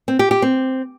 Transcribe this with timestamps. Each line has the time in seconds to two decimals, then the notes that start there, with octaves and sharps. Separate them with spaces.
0.08 C4
0.19 G4
0.31 G4
0.42 C4